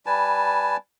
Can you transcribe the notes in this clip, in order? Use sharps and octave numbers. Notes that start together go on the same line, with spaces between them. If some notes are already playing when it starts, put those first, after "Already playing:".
G3 B4 G#5 A5